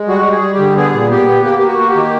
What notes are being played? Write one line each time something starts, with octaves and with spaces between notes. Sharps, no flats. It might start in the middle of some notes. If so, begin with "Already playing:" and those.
Already playing: G#3
G3 F#4
G3
G#4
G3
D3 G4
B3 G#4
A#2
B3 G4
B3
A#3 G4
A#3 G4
F#4
A#3
G4
D#3